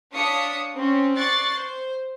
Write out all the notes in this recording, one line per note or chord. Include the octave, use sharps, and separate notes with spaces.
D4 C#5 F5 D#6 B6 C#7
C4 C#4
D5 C#6 F#6 A6 C7
C5